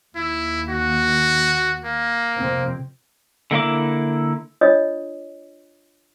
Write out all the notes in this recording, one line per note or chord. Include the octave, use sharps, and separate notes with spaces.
D#2 E4
F#4
A#3
F2 C3 C4
D3 A#3 E4 D6
D4 F4 C#5 D#5 D#6